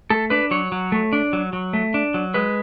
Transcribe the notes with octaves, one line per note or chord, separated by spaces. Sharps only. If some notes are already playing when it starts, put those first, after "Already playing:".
A3 A4
D4 B4
F#3 C#5
F#3
A3
D4
F#3
F#3
A3
D4
F#3
G#3 B4